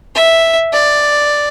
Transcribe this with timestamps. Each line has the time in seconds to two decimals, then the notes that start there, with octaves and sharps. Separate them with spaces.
0.15 E5
0.73 D5